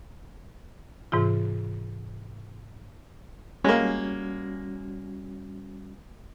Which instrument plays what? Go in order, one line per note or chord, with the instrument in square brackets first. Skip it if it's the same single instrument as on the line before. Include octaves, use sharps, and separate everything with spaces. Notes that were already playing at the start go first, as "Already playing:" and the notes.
[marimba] G#2 C3 E3 F4
[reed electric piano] G3 C#4 F#4 [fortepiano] G#3 A#3